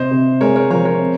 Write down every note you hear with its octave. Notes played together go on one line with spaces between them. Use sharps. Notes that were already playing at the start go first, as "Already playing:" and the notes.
Already playing: C3 C5 D#5
C3
G#3 A#4 C#5
A#4 C#5
F3 A#4 C#5
A#4 C#5
C4